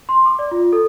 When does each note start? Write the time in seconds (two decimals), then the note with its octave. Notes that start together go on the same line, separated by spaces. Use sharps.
0.09 C6
0.26 D6
0.39 D5
0.51 F4
0.73 A4